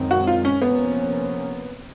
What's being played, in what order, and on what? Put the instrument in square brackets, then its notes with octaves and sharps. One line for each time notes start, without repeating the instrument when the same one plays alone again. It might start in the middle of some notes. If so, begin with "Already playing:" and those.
Already playing: [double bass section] F#2 D#3 G#3 C4
[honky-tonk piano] F#4
F4
C#4
[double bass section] C3 F3 A#3 C#4 [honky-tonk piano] B3